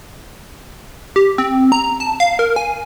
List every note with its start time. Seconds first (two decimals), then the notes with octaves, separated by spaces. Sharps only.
1.16 G4
1.38 C4
1.72 A#5
2.00 A5
2.20 F5
2.39 A#4
2.56 G#5